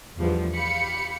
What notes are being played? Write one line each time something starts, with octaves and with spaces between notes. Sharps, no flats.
E2 A2 D3 F3 G3 B3
G4 F5 B5 C#7